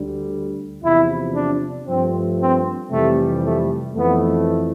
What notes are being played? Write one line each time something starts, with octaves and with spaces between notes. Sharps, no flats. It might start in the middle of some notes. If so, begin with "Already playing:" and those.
Already playing: D2 D3 G3
E2 C3 F3 E4
D4
G2 F3 A3 C4
C4
F2 C3 E3 G3 A3
A3
F2 E3 A3 B3